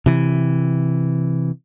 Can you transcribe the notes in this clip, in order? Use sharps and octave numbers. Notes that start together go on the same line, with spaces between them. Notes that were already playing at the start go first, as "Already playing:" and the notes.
C3 E3